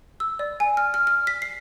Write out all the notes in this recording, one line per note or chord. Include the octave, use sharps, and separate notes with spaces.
E6
D5
G#5
F6
F6
F6
B6
C7